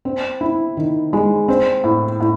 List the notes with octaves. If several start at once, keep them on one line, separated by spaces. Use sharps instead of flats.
C4
E4
D#3
G#3
C4
A2
A2